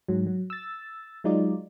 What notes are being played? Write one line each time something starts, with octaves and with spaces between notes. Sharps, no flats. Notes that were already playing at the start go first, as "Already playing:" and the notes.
G#2 F#3
F#3
E6 A6
F#3 G#3 D#4 F4 D5